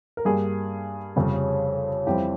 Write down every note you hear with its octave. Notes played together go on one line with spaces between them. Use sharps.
A#4
G2 G3 A#3 G#4
F1 F2 C#3 G3
F2 E3 G3 C4 G4